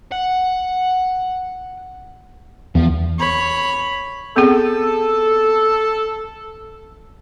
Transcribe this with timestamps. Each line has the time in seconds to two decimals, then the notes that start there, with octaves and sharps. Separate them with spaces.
0.12 F#5
2.75 E2 F3
3.19 C#5 B5
4.36 B3 C4 G#4 A4